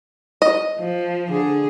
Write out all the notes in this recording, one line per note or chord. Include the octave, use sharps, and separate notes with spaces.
D#5
F3
D3 G#4